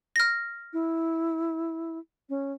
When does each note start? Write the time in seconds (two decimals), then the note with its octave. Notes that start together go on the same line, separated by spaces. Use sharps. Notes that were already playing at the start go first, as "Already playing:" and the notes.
0.16 F6 A#6
0.73 E4
2.29 C#4